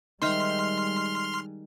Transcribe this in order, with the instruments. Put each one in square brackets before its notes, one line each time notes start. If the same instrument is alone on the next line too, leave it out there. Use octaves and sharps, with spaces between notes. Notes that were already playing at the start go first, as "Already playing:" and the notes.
[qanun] D#3 C5 E5 [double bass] G3 G#3 [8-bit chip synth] C6 F6